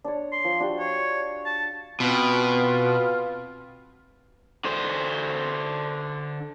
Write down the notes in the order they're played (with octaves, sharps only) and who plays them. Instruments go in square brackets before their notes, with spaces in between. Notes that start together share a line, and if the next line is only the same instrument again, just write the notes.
[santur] D4 C#5
[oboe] C6
[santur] F3
D4 F#4 G4
[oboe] C#5
A5
[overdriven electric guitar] B2 [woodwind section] B3 C4 F4
[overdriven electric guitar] D3 C5